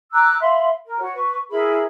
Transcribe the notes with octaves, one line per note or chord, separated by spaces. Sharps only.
A#5 D6 E6 F#6
E5 F5 B5 C6
A#4
F#4 C#5
B4 C#6
E4 G#4 A#4 B5